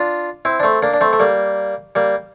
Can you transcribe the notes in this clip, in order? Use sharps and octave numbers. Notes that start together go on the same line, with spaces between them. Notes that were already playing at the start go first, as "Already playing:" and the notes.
Already playing: D4 F4
C4 E4
D4
A3 C4
A#3 D4
D4
A3 C4
A3
G3 A#3
G3 A#3